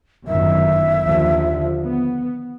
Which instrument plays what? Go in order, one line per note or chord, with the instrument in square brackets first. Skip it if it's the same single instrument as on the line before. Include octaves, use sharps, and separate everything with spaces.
[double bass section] G1 F#2 D#3 [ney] E5
[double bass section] D#2 D3 F3
B3